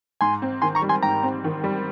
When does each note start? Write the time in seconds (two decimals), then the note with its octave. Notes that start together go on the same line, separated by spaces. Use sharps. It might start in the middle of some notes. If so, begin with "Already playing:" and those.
0.21 G#2 G#5 C6
0.42 C4
0.62 D#3 G#5 C6
0.75 A#5 C#6
0.82 G3
0.89 G#5 C6
1.03 G#2 G5 A#5
1.23 C4
1.44 D#3
1.64 G3